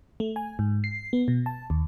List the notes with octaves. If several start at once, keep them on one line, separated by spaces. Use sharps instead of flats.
A3
G#5
G#2
C7
B3
B2
A5
D#2